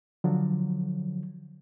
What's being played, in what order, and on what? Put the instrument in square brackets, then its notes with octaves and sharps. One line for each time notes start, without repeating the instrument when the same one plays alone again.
[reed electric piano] D3 F3 F#3